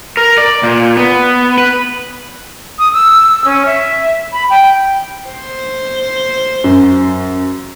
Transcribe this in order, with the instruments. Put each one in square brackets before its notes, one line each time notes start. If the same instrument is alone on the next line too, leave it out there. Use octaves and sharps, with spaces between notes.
[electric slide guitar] A#4
D5
A#2
B3
B4
[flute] D#6
E6
C#4
E5
B5
G5
[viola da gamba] C5
[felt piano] F#2